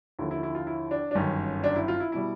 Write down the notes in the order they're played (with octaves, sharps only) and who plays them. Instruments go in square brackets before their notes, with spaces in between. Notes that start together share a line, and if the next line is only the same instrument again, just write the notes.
[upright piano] D#2 D3 F3 E4
E4
E4
F4
E4
D4
D4
G1 F#2 D#3 C#4
D4
E4
F4
E4
B2 G3 E4